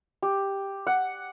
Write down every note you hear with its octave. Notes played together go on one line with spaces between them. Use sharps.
G4
F#5